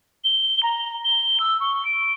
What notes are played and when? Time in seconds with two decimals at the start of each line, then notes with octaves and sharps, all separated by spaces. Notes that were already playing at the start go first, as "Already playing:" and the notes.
0.24 G7
0.63 A#5
1.04 G7
1.40 E6
1.60 C#6
1.85 D7